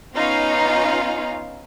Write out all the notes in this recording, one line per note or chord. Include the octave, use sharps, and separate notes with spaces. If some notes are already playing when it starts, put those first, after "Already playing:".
B3 C#4 D#4 F4 F5